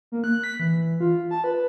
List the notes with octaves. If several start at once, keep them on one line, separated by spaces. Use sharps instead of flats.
A#3
F#6
B6
E3
F4
A5
B4